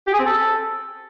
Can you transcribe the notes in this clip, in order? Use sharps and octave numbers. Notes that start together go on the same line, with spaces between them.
G4
G#4
C4
A4